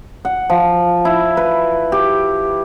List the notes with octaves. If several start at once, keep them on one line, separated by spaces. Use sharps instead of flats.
F#5
F3
E4
B4
G4